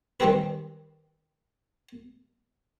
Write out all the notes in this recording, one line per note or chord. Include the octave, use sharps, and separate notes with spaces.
D#3 G3 C4 G4 G#4 B4